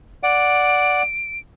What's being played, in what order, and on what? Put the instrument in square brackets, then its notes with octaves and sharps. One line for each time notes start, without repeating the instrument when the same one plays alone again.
[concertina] D5 F#5 [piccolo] D7